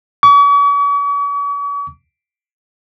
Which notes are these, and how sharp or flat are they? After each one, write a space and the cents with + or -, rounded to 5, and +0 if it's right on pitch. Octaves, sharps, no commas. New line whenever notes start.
C#6 +45